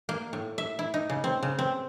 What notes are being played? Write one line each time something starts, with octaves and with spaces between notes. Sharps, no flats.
A#3
A2
E5
E4
D#4
C#3
C4
C#3
C4